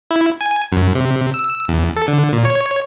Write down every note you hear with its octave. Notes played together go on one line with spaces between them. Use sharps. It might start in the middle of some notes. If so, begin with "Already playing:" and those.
E4
G#5
F#2
C3
E6
E2
A4
D3
A#2
C#5